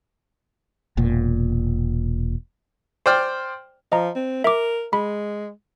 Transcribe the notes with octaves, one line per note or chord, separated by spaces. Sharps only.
E1 A#2
C5 D5 G5 F6
F3 D#5 A#5
C4
A#4 E5 D6
G#3 B5